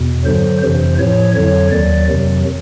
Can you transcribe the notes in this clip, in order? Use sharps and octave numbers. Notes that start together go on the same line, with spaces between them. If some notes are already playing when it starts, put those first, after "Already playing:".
Already playing: E2 B2
G2 D3 F#3 C5
F2 C3 E3 C5
A2 F3 C#5
F2 D3 F#3 C#5
D#2 D#3 F#3 D5
F2 C3 D#3 F#3